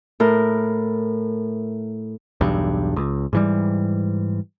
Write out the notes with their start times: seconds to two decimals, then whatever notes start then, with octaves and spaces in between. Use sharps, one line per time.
0.20 A2 A#4
2.41 B1 E2 G2
2.96 C#2
3.33 G#2 E3 G3